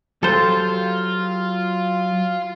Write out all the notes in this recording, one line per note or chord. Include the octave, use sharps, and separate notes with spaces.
F#3 F4 G4 A4 C5